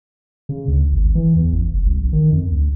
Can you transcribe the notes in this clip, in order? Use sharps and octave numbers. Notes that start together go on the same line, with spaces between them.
C#3
D2
G#1
E3
E2
A1
F1
C2
A#1
D#3
F2
D2